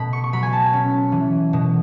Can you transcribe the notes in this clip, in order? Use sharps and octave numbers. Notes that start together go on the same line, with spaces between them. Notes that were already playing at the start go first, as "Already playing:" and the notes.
Already playing: B2 A3 B5
C#6
C#6
F#3 B5
G#5
A5
C#4
E3
B2